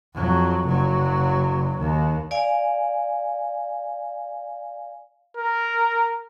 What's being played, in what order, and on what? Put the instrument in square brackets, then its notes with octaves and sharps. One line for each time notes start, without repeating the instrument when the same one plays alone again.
[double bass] F2 F#3
F#1 F#3
D#2
[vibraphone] D5 F5 G#5
[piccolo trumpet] A#4